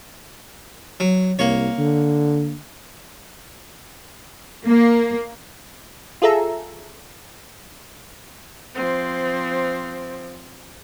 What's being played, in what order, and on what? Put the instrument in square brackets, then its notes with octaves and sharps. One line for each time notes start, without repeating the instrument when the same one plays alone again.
[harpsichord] F#3
[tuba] C2 [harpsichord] A#3 C#5
[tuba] D3
[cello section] A#3
[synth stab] F4 G#4 A4 E5 A#5
[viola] F3 C4